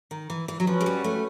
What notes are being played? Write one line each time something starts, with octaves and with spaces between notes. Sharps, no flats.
D#3
E3
E3
F#3
F3 C#4 F#4 B4
G#3
G3
A3